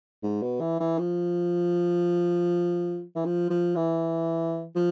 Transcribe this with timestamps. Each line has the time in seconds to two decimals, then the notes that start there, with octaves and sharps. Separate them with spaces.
0.23 G#2
0.42 B2
0.60 E3
0.80 E3
0.99 F3
3.16 E3
3.25 F3
3.50 F3
3.76 E3
4.75 F3